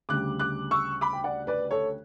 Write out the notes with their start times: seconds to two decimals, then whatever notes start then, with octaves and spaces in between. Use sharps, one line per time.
0.09 D2 C#3 G3 D6 F#6
0.39 D6 F#6
0.71 C#6 E6
1.01 B5 D6
1.13 G5
1.24 D5 F#5
1.47 B4 D5
1.71 A4 C#5